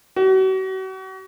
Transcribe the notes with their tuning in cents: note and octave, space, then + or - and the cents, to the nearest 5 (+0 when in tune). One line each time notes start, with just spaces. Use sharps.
F#4 +40